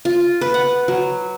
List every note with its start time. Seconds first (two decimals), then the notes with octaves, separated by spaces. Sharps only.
0.05 F4
0.41 B4
0.54 F#5
0.88 F#3